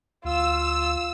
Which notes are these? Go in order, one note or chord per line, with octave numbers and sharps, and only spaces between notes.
D2 F4 E6